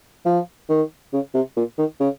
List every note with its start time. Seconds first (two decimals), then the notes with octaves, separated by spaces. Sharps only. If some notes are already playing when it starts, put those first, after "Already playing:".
0.26 F3
0.69 D#3
1.13 C#3
1.34 C3
1.56 A#2
1.78 D#3
2.00 C#3